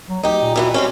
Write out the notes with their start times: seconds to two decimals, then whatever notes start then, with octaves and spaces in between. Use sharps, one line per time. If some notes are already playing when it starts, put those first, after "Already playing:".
0.09 F#3
0.23 D2 D#4 G4
0.41 A#2
0.56 B2 E3 B3
0.74 G3 C4 C#4